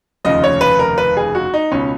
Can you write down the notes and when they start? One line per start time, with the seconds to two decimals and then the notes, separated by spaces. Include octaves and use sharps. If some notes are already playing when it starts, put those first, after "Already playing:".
0.25 F1 D#2 C#3 F3 D#5
0.44 C#5
0.61 B4
0.79 A#4
0.98 B4
1.17 G#4
1.35 F#4
1.54 D#4
1.71 C#2 B2 C#4